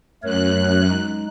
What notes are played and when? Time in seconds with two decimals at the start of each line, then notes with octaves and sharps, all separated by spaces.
0.23 F#2 A3 A#4 C#5 F#6
0.89 G#3 D#4